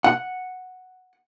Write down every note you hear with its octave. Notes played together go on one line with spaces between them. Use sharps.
F#5